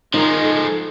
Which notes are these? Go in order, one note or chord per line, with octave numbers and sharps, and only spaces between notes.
D#3 F3 G#3 D#4
A4